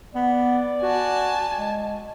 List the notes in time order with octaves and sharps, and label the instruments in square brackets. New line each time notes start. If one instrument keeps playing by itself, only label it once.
[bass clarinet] B3 [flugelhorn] D5
[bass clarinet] F#4 [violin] G#5 A5
[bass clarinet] G#3